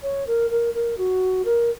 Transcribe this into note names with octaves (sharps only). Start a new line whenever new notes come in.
C#5
A#4
A#4
A#4
F#4
A#4